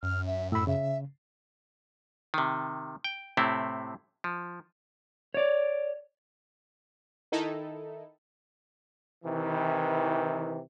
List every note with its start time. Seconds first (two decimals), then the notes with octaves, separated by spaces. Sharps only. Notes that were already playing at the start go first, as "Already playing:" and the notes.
0.03 F#2 F6
0.27 E5
0.52 A2 B5 E6
0.67 C#3 E5
2.34 C3 D#3
3.04 G5
3.37 A2 C3 A3 C4 E4
4.24 F3
5.34 C#5 D5
7.32 D#3 D#4 E4 A4
9.24 C3 D#3 E3